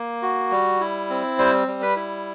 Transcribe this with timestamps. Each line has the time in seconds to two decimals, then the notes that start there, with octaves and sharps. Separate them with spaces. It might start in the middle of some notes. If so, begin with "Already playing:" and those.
Already playing: A#3
0.22 F#4
0.51 G3
0.81 E4
1.10 C4
1.39 G3 C5
1.67 G3
1.82 B4
1.96 E4